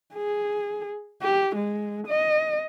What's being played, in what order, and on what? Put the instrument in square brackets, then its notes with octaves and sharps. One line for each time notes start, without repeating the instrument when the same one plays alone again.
[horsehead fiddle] G#4
G4
G#3
D#5